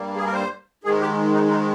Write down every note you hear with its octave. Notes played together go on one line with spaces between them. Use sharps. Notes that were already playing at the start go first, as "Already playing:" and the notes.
Already playing: G2 G3 A#3
G#4
A#4
C5
G#2 D#3 G#3 G#4
G4
D#4
D#4